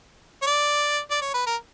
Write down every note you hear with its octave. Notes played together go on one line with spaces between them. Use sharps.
C#5
D5
D5
C#5
B4
A#4